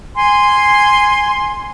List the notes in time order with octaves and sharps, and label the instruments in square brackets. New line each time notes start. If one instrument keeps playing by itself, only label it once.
[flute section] G#5 C6